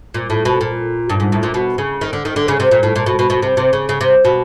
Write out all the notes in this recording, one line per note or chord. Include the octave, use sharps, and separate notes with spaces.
A#2
A2
B2
A#2
G2
G#2
A2
A#2
B2
C#3
D#3
D3
D#3
D3
C#3
C3
A#2
A2
A#2
B2
B2
B2
C3
C3
C#3
C#3
C3
B2